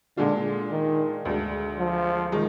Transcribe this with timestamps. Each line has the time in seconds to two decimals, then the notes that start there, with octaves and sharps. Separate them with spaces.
0.17 A#2 D3 G#3 D4 F4
0.71 D#3
1.25 D2 D3 G#3
1.79 F3
2.32 D#3 G#3 D#4